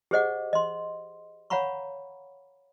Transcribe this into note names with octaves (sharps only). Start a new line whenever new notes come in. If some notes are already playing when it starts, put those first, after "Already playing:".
G4 G#4 C5 D#5 F#5 D6
D#5 C6
C#5 F5 F#5 A#5 B5 C#6